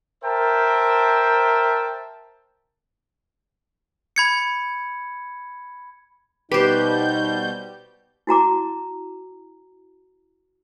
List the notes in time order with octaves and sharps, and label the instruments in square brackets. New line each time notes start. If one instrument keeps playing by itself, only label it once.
[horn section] A#4 C5 E5 G5 A5
[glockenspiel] B5 G#6 C#7
[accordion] B2 G3 G6 [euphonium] D#4 [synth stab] G4 [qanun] B4 C5
[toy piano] E4 F#4 A#5 D6